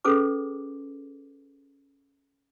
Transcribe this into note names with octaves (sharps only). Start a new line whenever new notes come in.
C#4 G#4 A4 B4 D6